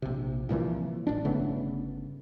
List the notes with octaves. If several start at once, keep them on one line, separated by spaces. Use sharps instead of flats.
A#1 C3
C2 A#2 E3 F3
D1 A1 D4
G1 C#3 A3 B3